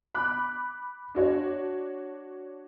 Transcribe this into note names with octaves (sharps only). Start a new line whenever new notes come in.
B5 D6 F#6
D4 F#4 C#5